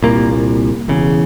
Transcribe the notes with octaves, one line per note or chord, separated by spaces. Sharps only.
C2 A#2 A#3
E1 E2 C#3